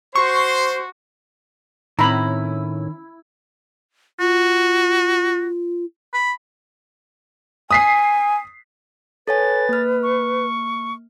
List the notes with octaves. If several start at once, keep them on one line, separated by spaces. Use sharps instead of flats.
F#4 C5 C6 C#6
A2 D#3 C4 C#4 E4 A#5 B5
F4 F#4
B5
G#5 D#6 B6 C7
A4 B4 C#5 G#5 A6
A#3 F6
C#6